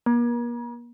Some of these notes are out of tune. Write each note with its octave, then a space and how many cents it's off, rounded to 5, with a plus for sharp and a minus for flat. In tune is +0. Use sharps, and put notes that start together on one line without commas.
A#3 +40